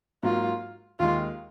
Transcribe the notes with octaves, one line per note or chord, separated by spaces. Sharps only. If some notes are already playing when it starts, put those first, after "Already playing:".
G#2 F#3 A#3 F4
D#2 D#3 G#3 F4